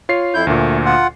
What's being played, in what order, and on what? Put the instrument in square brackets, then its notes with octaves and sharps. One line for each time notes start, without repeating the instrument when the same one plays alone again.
[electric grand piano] F4 C#5 C7
[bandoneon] F2 E4 G6
[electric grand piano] D2 A#2 [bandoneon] A3
[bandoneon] F4 F#5